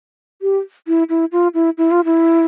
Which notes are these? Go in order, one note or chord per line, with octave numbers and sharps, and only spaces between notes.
G4
E4
E4
F4
E4
E4
F4
E4